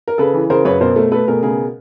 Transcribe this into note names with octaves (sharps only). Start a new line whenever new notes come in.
A#4
C#3 A4 B4
E3
C#3 A#4 C5
F#2 B4 C#5
B2 A#4 C5
A3
A3 A4 B4
B2 G#4 A#4
C#3 G#4 A#4